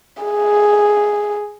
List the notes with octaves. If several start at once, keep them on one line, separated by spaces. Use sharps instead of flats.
G#4